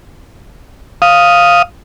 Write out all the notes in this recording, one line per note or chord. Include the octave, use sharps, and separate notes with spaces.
F5 D#6